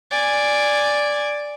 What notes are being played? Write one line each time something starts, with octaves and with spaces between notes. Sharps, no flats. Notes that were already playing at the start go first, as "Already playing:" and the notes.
D5 G#5